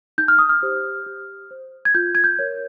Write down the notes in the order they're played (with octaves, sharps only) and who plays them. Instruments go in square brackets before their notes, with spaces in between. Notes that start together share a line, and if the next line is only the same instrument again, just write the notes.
[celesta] D#4 G6
F6
D#6
F6
G4 C5
G4
C5
G#6
F4 G6
G#6
G6
A#4 C#5